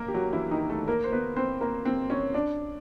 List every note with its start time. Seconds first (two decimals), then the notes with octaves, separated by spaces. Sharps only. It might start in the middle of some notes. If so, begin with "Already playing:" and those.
Already playing: A#3 A#4
0.08 G4
0.14 F#3 F#4
0.33 E3 E4
0.51 D#3 D#4
0.70 A3 A4
0.88 A#3 A#4
1.04 C5
1.12 B3 B4
1.37 C4 C5
1.61 A#3 A#4
1.85 C4 C5
2.10 C#4 C#5
2.34 D4 D5